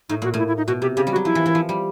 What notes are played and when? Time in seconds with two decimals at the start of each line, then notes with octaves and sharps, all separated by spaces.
0.09 A2 D#4
0.22 A#2 F#4
0.34 A2 E4
0.48 E4
0.57 D#4
0.67 B2 F#4
0.82 C3 G4
0.96 C#3 G4
1.07 G3 F#4
1.16 F#3
1.25 F3 E4
1.35 E3
1.46 E3
1.55 F3
1.69 G3